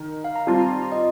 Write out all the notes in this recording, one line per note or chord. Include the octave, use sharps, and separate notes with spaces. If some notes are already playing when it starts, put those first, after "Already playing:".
Already playing: D#3
F5
A#5
G3 C4 F4 A5
A#5
C6
A#5
D#5